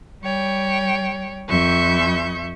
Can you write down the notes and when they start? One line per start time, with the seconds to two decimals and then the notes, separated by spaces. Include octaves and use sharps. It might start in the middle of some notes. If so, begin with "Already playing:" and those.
0.22 G3 C#5 G5
1.49 F2 E5 C#6 G6